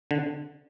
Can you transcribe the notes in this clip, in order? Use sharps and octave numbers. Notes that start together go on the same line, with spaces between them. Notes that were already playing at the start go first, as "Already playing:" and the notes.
D3